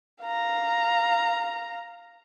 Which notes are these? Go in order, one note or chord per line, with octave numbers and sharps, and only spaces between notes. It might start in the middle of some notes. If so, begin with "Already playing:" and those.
F5 A#5